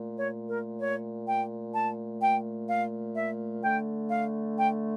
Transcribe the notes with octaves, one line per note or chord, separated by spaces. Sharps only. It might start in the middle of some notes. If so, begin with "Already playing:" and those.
Already playing: A#2 A3
C#5
A#4
C#5
G5
A5
G5
F5
E5
D3 A3 G5
F5
G5